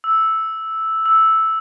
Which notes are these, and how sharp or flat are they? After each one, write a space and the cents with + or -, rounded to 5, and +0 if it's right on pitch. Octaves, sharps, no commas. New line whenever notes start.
E6 -5
E6 -5